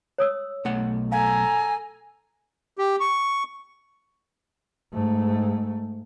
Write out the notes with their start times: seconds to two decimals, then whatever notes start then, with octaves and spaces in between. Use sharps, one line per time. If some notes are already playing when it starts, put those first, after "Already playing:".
0.18 C#5 D#6 E6
0.65 B1 A3 F#5
1.12 A4 F5 G#5 A#5
2.78 G4
3.00 C#6
4.93 G#2 A3